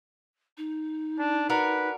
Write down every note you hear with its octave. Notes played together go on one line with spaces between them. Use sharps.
D#4
D4
D4 F#4 A#4 B4